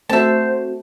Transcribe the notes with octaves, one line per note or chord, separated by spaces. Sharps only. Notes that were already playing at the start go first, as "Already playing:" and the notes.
A3 C4 F#4 C5 E5 A5